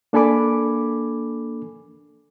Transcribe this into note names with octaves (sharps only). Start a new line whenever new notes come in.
A#3 D4 A4 G#5 B5 D6